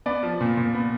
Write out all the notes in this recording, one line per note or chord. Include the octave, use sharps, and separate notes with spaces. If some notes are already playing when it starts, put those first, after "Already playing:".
B3 D5
F3
A#2
A#2
B3